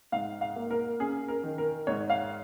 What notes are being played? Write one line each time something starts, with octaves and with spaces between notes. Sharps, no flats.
G#2 F5
F5
A#3
A#4
C#4 G#4
A#4
D#3
A#4
G#2 C#5
F5